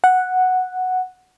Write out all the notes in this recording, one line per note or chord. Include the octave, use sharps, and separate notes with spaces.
F#5